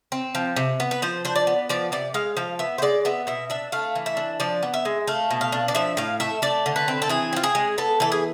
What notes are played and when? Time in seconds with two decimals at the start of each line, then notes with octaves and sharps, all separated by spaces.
0.12 C4
0.35 F3
0.56 C3
0.80 B3
0.91 B4
1.02 F3 C5
1.25 D4 C5
1.36 D5
1.47 B3
1.69 F3 D5
1.92 C3 D5
2.14 G#3 F5
2.37 F3 F5
2.59 B3 E5
2.78 C5
2.82 G#3 D5
3.05 B3 E5
3.27 B2 E5
3.50 D4 E5
3.72 A3 F5
3.95 E3
4.06 E5
4.17 D4
4.40 F3 D5
4.63 B3
4.74 E5
4.85 G#3
5.07 A3 F5
5.31 B2
5.41 F5
5.52 D4
5.68 D5
5.75 F3 E5
5.97 A2 F5
6.20 A3 E5
6.42 A3 D5
6.66 D3
6.76 B4
6.88 C4
7.02 A4
7.09 E3 G#4
7.33 C4 F4
7.43 G#4
7.55 G#3
7.78 B3 A4
8.00 E3 A4
8.12 G#4